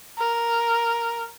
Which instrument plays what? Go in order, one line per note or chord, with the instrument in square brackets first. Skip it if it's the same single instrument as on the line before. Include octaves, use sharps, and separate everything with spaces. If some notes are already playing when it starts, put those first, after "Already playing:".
[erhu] A#4